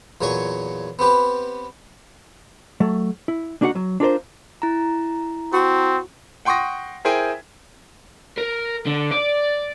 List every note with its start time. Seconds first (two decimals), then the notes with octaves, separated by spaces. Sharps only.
0.21 E2 A#2 F#3 C#5 G#5 C#6
0.99 B3 C4 G4 B4
2.80 F#3 A3
3.28 E4
3.61 A#3 D4 D#4 F#4 E5 F#5
3.75 F#3
4.00 D4 F4 A#4 C5
4.62 E4 A#5
5.53 C4 F#4
6.45 F#5 G5 C6 C#6 D#6 A#6
7.05 E4 G#4 A#4 C5 G5 G#5
8.38 A#4
8.87 D3
9.12 D5